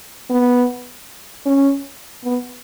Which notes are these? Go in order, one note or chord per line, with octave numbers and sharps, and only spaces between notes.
B3
C#4
B3